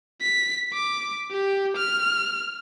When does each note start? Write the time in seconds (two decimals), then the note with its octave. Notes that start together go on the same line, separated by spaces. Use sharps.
0.22 B6
0.74 D6
1.31 G4
1.77 F6